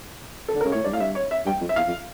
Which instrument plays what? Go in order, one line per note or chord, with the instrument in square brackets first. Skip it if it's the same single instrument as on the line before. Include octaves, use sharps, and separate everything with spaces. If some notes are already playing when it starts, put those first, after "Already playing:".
[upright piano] A4
[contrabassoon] D3
[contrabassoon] C#3 [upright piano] A#4
[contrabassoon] A2 [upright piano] C#5
[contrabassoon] G2 [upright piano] D5
[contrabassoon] A2 [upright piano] F5
[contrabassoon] G2 [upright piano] E5
[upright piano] C#5
E5
[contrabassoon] G2 [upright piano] G5
[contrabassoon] F2
[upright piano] E5
[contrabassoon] E2 [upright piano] F5
[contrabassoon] F2